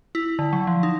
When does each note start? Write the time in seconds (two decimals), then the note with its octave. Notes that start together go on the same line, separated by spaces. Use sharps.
0.15 E4
0.39 D3
0.53 F#3
0.67 F3
0.83 D#4